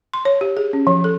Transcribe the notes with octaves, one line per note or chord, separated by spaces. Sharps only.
C6
C#5
G4
G#4
C#4
F3
A4